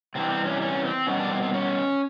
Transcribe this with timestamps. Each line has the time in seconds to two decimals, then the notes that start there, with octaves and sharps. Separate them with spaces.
0.15 C3 E3 G3 C4
0.30 C4
0.46 C#4
0.61 C#4
0.84 C4
1.07 B2 G3 B3 C#4
1.19 D4
1.30 C4
1.42 C4
1.54 C#4